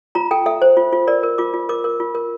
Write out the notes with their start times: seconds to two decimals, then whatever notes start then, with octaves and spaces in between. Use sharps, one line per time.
0.15 F4 A#5
0.31 A4 G5
0.46 A4 E5
0.62 C5
0.77 F4
0.93 F4
1.07 A#4 D5
1.23 A#4
1.38 F4 D6
1.54 F4
1.69 A#4 D6
1.84 A#4
2.00 F4
2.15 A#4